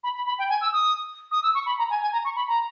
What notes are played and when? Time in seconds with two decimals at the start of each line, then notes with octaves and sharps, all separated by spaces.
0.03 B5
0.15 B5
0.26 B5
0.38 G5
0.49 G#5
0.61 E6
0.72 D#6
1.31 D#6
1.43 E6
1.54 C#6
1.66 B5
1.78 A#5
1.90 G#5
2.01 G#5
2.12 A#5
2.24 C#6
2.36 B5
2.47 A#5